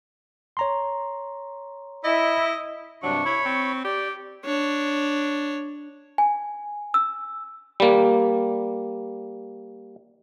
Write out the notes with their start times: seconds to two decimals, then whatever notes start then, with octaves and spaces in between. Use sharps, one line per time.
0.57 C#5 A#5 C6
2.04 E4 D#5
3.04 G2 C3 F#3 D4 C#6
3.25 E4 C#5 B5
3.45 C4
3.85 G4 D5
4.45 D4 C#5
6.18 G#5
6.94 E6
7.80 G3 A#3